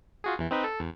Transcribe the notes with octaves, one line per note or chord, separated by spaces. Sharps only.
F4 F#4 G#4
E2 E3
C4 D#4 B4
A4
E2